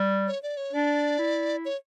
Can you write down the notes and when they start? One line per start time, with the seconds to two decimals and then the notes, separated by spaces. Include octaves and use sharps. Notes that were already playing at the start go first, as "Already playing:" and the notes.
Already playing: G3
0.27 C#5
0.43 D5
0.57 C#5
0.72 D4 D5
1.19 E4
1.65 C#5